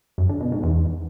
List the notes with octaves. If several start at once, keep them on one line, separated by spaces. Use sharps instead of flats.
F#2
D3
B2
G#2
E2